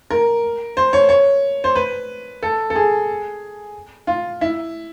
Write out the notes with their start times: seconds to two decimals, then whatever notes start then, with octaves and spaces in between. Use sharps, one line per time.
0.10 A#4
0.77 C5
0.93 C#5
1.09 C#5
1.64 C5
1.76 B4
2.43 A4
2.70 A4
2.75 G#4
4.07 F4
4.41 E4